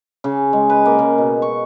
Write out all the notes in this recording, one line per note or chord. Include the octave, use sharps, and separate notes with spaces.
C#3
G#3
B4
A#3
C#3
B2
C#6